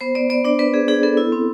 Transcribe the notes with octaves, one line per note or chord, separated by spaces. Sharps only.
B3 C5
B3 D5
B3 D5
D4 D5
B3 B4
B3 G#4
D4 G#4
B3 A4
E4
C4